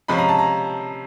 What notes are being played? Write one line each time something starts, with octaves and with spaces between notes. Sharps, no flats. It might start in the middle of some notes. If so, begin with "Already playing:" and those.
C3 F3 G#3 C#4 B5
A#5
A5
A#5